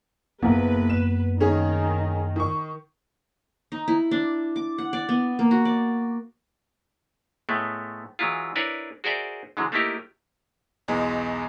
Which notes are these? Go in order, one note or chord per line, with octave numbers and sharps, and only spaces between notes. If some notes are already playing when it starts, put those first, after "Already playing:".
F#1 F#2 A#3 B3 B4
E7
D#3 C#4 G#4
D#3 C#6
D#4
E4
D4
D6
F#5
D5
B3
A#3
F#4
D5
A2 G#3 A3 B3
E3 F#3 G#3 E4 F4
D4 E4 A#4 B4 C#5
F#4 G#4 A#4 C5 D5 E5
D3 E3 F#3 G#3
A3 A#3 D#4 E4 G4 A#4
B1 E2 G#3 B3